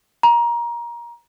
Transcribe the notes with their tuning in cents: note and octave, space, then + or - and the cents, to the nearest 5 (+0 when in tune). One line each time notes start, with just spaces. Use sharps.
A#5 +20